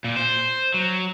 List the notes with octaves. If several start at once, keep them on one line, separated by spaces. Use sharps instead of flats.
A#2
C5
F#3